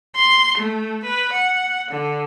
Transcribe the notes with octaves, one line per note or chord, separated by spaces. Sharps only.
C6
A3
B4
F#5
D3